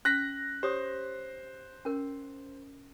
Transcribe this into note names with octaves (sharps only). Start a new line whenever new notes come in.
C#4 F#6 A#6 B6
G4 C5 C#5 D#6
C#4 A#4